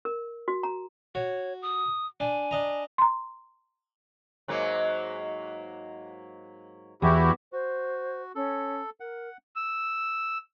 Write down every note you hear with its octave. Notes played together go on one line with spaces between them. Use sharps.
A#4
F#4
A#5
F#4 C#5
D#6
D4 G#5
D4 D#5 A#5
A#5 C6
G#2 F#3 A#3
E2 E4 F#4 G4
F#4 C5
C#4 A4
A#4 F#5
E6